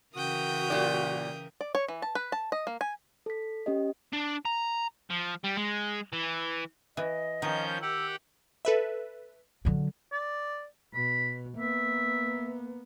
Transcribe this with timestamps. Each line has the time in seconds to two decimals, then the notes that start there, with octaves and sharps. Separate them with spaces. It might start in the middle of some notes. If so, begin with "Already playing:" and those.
0.16 C#3 E3 F#4 A#4 G5 D#6
0.70 A#2 G4 D5
1.61 D5
1.75 C#5
1.88 E3
2.02 A5
2.15 B4
2.32 A5
2.52 D#5
2.67 A#3
2.81 G#5
3.26 A4 B6
3.66 C#4 G4 D#5
4.13 D4
4.45 A#5
5.10 F3
5.44 G3
5.57 G#3
6.13 E3
6.97 E3 D#5
7.42 D#3 F3 C#4 G6
7.82 G4 F#5 G5 E6
8.65 A4 B4 E5
9.65 D3 F#3
10.12 D5
10.94 B2 B5
11.57 A#3 B3 E5